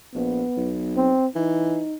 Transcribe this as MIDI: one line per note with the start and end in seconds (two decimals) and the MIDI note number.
0.15 0.43 34
0.15 0.74 59
0.57 1.14 35
0.96 1.27 60
1.36 1.81 52
1.36 1.97 63